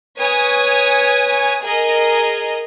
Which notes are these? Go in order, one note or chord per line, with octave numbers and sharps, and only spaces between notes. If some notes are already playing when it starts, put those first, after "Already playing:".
B4 C#5 G#5 D#6
G#4 A#4 D#5